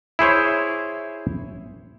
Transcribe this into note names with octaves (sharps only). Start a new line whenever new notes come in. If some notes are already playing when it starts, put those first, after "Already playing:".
E4 G#4 C5 C#5